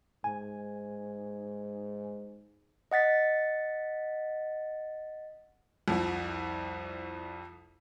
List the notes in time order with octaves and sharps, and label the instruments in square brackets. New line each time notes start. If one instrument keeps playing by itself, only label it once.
[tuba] G#2 [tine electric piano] G#5
[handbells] D#5 F#5 A6 B6
[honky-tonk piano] C2 F2